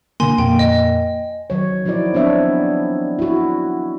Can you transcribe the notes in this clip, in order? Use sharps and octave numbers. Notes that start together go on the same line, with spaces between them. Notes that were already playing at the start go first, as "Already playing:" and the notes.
B2 D3 A#3 G#5 C6
F2 A#2 A#3 G5
D#5
D#3 F#3 C#5
F3 D#4 E4 F#4 D5
B3 C4 D4 C#5 E5
E4 F#4